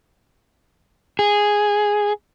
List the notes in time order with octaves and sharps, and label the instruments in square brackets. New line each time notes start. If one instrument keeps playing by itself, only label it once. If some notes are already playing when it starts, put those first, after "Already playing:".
[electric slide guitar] G#4